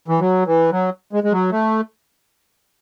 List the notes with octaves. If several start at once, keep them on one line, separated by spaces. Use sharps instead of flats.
E3
F#3
E3
F#3
G#3
G#3
F#3
A3